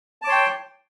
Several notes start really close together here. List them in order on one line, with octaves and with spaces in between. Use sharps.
A5 D6 C#5 C6 G5